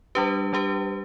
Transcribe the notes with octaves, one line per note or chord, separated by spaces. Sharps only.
G3 D4 G4 B4
G3 D4 G4 B4